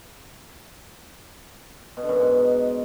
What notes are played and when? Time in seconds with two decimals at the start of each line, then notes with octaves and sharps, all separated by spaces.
1.97 B2
2.03 D3
2.09 F#2
2.15 B2
2.21 G#2